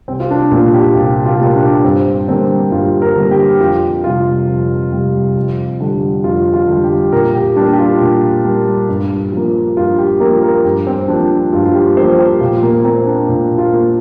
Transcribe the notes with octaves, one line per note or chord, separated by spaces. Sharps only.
C2 C4
F4
D4
A#2 A#3 F4
G4
C2 F4
F4
G4
A#2 A#3 F4
D4
G2 C4
D3 G3 A#3 C4
G2 F4
A#4
D3 G3 A#3
G4
F2 F4
C3 G3 F4
F2
C3 G3
F2
D3 G3
F2 F4
F4
D3 G3
G4
A#2 A#4
G4
G3 A#3 D4
G4
F4
A#2
G3 A#3
G2
F3 A#3
G2 F4
G4
F3 A#3 A#4
A#4
G2 G4
C4
F3 A#3 D4
G2 F4
F4
G4
F3 A#3 C5
G4
A#2 F4
A#3
A#3 C4
D4
A#2
F4
A#3